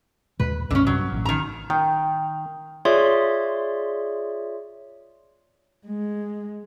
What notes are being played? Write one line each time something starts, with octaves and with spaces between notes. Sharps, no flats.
D#2 A#2 G#3 B4
B1 F#2 A2 D3 C#4
G2 C3 F#3
A1
D#3 A#5
D#3 G5
F4 G#4 C#5 D5 E5 C6
G#3